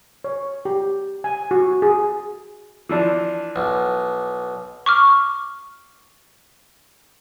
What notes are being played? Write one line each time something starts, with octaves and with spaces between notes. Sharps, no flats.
C#5
G4
G#5
F#4
G#4
E3 F3 D4
B1
C#6 D6 F6